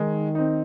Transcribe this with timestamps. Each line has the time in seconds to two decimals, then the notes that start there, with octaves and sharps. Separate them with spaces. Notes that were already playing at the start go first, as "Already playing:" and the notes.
Already playing: D#3 G#3
0.35 C4 D#4